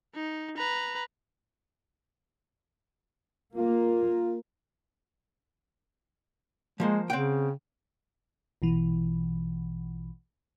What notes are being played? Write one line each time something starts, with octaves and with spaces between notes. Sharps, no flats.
D#4
B4 A#5
A#3 F4
F3 G#3 A#3 C5
C#3 C4 F#5 G5
A#1 B2 E3